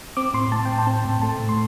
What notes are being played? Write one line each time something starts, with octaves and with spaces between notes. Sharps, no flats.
C4 D6
A2 C6
A2 A5
A2 G5
A5
C4
A2
A3 A5
A2
C6